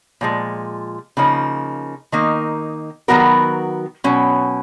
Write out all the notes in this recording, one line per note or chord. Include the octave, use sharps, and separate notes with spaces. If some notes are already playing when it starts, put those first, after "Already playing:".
A#2 F3 G#3
C#3 F3 A#3 D#4
D#3 A#3 D#4
D#3 F#3 B3 F#4 A#4
B2 F#3 C#4